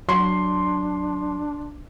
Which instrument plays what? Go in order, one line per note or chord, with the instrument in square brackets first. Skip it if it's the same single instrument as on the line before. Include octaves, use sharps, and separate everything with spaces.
[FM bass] F#3 [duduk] D4 [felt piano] C6